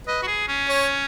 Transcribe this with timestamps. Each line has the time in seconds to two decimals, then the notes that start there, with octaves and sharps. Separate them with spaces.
0.07 B4 D#5
0.22 F#4
0.27 G#4
0.48 C#4
0.68 C#5